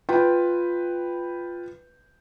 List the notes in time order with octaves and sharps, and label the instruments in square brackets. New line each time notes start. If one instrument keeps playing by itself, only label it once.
[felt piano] F4 B4 G5